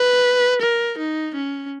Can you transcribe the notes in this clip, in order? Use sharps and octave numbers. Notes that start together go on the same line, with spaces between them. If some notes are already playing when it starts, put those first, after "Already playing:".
Already playing: B4
A#4
D#4
C#4